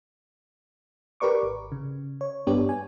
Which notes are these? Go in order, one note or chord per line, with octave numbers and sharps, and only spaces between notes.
G4 A#4 B4 D5 C#6 D6
G#1
C#3
C#5
G2 B3 D4 G4 C#5
G#5